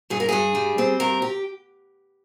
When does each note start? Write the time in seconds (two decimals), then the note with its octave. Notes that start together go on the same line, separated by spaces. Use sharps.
0.10 G2 G#4
0.20 A#4
0.29 G2 G#4
0.55 G3
0.78 C4
1.00 G2 A#4
1.22 G4